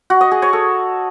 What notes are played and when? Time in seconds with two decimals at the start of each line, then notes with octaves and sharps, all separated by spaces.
0.10 F#4
0.21 D#5
0.31 G#4
0.42 C#5
0.53 A4